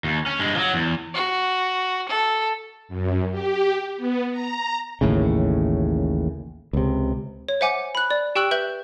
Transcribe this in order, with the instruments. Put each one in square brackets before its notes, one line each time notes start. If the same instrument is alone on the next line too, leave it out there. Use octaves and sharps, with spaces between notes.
[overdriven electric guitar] D#2
C#4
G2 G#3
F3 F#3
E2
[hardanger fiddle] F#4
A4
[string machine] F#2
G4
B3
A#5
[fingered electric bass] A1 D#2 A2 C#3
C#2 C3
[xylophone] C#5
C5 E5 F#5 G#5 D6
B5 F#6
D5
G4 G5 C#6 E6 F#6 F#7
B4 E5 G6 F#7